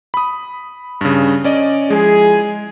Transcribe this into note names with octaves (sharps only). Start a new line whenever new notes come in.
B5 D#6
G2 C#3
C#4 D5 D#5
F3 G#3 E4 G#4